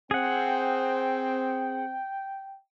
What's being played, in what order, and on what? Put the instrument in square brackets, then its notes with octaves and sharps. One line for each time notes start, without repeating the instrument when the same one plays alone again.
[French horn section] C4 [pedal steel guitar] G#4 F#5 [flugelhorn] G5